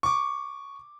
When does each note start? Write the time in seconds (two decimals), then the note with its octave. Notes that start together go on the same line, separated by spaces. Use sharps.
0.03 C#6 D6